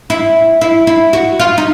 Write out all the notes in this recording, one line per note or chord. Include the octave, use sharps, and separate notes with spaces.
E4
E4
E4
F#4
F4
D#4